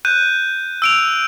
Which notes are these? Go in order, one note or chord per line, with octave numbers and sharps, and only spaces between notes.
F#6 G6 D#7
E6 D7 F7